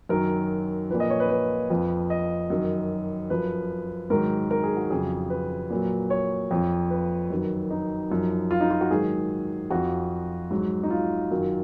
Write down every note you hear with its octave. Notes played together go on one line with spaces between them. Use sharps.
F#2 D#3 F#3 A#4
A#2 F3 B4
D#5
C#5
B4
B4
F2 F3
D#5
F#2 D#3 F#3
F#2 F3 B4
G#2 D#3 F#3 A#4
A#4
G#4
F#4
F2 C#3 F#3 G#4
B4
A#2 F#3
C#5
F2 F3
B4
F#2 D#3 F#3
D#4
F#2 F3
F4
D#4
F4
F#4
G#2 D#3 F#3 G#4
F2 F3 F#4
G#2 F#3
D#4
F4
F#2 D#3 F#3